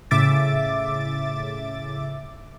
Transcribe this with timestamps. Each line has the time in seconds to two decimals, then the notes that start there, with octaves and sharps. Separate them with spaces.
0.11 A2 C#3 E5 D6 A6